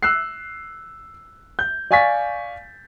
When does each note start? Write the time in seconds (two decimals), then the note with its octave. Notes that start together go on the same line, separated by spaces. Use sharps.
0.03 E6 F#6 C7
1.59 G6
1.91 D5 F5 G#5 C#6 A6 B6